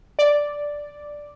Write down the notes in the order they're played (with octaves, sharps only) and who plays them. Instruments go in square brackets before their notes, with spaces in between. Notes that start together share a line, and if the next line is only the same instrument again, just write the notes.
[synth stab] D5